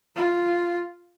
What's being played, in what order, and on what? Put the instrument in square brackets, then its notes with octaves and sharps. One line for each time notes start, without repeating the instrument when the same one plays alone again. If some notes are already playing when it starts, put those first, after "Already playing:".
[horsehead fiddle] F4